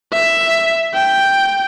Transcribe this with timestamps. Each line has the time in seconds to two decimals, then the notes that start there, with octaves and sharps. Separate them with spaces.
0.13 E5
0.94 G5